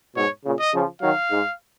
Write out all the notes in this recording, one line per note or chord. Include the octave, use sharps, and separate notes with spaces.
G#2 B2 C#5
A#2 C#3
D#5
C#3 F3
D#3 F#3 F5
G#2